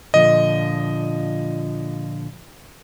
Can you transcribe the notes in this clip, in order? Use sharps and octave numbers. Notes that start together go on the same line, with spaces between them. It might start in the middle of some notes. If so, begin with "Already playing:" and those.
A#2 D3 F3 D#5